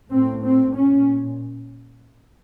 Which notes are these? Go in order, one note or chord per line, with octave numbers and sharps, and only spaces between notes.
A2 C4
C4
A#2 C#4